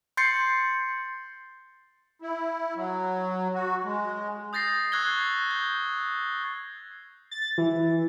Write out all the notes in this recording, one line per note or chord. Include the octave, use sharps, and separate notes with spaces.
C6 G6 A6 C7 C#7
E4
F#3
F#4
G#3
D#6 G6 A6 A#6 C7
C#6 E6 F#6 G#6 C7 G7
G6
A6
E3